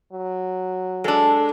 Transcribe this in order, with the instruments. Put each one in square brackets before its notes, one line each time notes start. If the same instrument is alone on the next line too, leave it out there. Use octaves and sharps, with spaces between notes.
[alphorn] F#3
[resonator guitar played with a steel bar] G#3 D4 [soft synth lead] A4